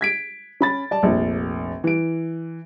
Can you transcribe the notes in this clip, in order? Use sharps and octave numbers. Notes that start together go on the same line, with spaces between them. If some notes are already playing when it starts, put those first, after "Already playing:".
G#6 B6 D7
C#4 B5 A6
D5 A5
F1 A#1
E3 D7